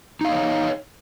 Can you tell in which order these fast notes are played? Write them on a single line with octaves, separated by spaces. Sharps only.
D#4 F5 D#5 C#5